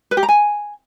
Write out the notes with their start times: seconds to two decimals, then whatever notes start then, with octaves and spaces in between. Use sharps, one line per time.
0.11 B4
0.17 G4
0.23 A#5
0.29 G#5